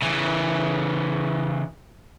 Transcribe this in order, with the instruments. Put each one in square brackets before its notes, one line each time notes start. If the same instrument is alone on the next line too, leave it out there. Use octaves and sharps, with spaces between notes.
[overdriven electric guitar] C#3 E3